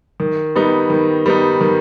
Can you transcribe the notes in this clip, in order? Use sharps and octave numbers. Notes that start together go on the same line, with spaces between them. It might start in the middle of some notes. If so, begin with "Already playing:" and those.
D#3
G3 B3 D#4
D#3
G3 B3 D#4
D#3